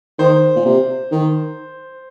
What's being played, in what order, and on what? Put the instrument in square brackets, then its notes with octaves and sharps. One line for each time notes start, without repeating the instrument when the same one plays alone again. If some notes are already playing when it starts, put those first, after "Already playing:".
[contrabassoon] D#3 [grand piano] C5
[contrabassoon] A#2
C3
D#3